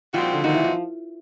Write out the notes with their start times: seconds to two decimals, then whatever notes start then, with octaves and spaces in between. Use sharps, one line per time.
0.14 A#2 F3 G3 C4 D#4 F#4
0.33 D3
0.44 A#2 D#3 G3 C4 D#4 F#4
0.54 E3
0.64 F3